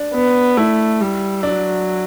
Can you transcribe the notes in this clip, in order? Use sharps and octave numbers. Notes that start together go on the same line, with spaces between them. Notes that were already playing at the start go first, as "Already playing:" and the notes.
Already playing: D4
B3
A3 E4
G3
F#3 D4